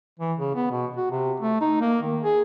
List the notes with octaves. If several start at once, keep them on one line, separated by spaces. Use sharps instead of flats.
E3
C#3
B3
B2
F#4
C3
A3
D#4
A#3
D#3
G#4